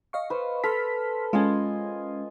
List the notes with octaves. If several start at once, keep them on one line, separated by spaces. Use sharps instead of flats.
D#5 F5 C#6
B4 C5
A4 C6 F6 B6
G#3 C#4 F4 D#5 G#5